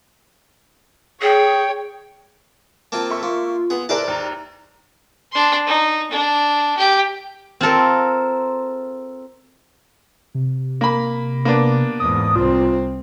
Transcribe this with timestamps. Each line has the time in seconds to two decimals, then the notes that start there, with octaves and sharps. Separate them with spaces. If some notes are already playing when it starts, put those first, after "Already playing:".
1.22 G#4 C#5 G5
2.92 A#3 C4 F4 A5
3.10 A4 E5 C#6 E6
3.23 A#3 F4
3.70 B3 G#4
3.89 E4 G#4 A#4 C5 D5 A5 F#6
4.08 D#2 A#5
5.32 D4 C6
5.67 D#4
6.11 D4
6.77 G4
7.61 C4 F4 A4 A#4
10.35 C3
10.81 A#3 B5
11.45 A#3 B3 D4
12.00 E2 G#2 D#6
12.36 C2 C4 F4